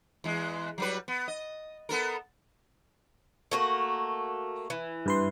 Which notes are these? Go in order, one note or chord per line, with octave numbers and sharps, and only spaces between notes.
E2 G#3
F#3 G3 B4
B3
D#5
B3 A4 A#4
A3 A#3 F#4
E3
G2 B4 C6